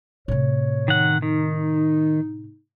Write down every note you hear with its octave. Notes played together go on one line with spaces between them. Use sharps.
A2 C3 C#5
D#3 F#5
D#3 D#4